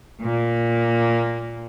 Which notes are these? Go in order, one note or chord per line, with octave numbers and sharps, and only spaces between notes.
A#2 A#3